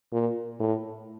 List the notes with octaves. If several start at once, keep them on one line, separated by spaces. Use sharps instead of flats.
A#2
A2